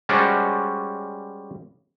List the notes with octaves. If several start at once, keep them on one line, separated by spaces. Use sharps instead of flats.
G3 G#3 C#4 F#4 C5 D5